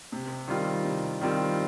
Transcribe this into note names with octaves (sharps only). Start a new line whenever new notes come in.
C3
D#3 G3 C4 F4
C3
D#3 G3 C4 F4